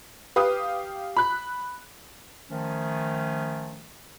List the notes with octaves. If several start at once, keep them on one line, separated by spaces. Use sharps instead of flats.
G4 B4 F5 D#6
B5 F#6
D#3 F3 A3 C#4